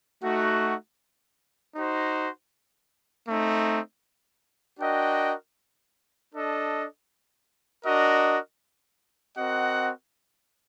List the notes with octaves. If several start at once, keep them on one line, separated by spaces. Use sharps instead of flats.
A3 D#4 F#4
D#4 F#4 C5
A3 C4 D#4
D4 F#4 A#4 D#5 G5
D4 A4 D#5
D4 F#4 A#4 D#5
C4 F#4 A#4 D#5 F#5